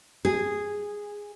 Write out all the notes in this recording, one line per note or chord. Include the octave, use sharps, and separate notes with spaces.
G#4